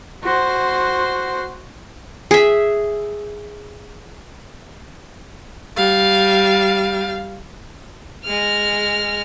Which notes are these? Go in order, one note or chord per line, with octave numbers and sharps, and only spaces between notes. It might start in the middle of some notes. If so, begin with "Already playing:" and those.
F#4 C5
G#4 E5
G3 F5
G#3 F6